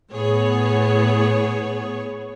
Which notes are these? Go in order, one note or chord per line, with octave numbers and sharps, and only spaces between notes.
A2 B3 G#4 C#5